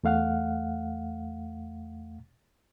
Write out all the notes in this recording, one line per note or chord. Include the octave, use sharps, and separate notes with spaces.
E2 A3 F5 F#5 F6